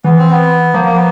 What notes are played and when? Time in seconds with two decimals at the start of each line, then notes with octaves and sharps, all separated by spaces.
0.04 E3 B3
0.18 C4
0.31 B3
0.73 F3 A#3
0.85 A#3
0.96 B3